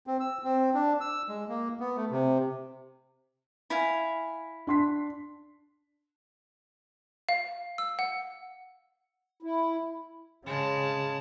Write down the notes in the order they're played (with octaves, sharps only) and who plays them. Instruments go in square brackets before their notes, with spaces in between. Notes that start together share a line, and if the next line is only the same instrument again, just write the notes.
[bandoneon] C4
E6
C4
D4
E6
G#3
A#3
B3
A3
C3
[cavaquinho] E4 F5 G#5
[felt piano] D4 C6 B6
[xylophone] F5
E6
F#5
[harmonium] E4
[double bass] C#3 [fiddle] G#3 A5